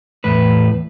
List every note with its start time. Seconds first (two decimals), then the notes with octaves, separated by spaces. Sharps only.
0.24 E2 A2 B4